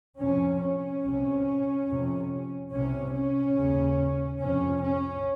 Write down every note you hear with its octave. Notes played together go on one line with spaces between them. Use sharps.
F2 C3 C#4
C#4
C2 C3
F2 C3
C2 C3 C#4
C#4
D#2 C#3
F2 C3 C#4
C#4